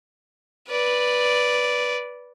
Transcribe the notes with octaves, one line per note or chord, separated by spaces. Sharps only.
B4 D5